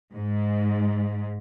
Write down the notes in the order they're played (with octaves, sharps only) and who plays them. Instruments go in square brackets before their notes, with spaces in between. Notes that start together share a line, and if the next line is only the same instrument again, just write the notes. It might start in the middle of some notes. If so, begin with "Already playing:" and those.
[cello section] G#2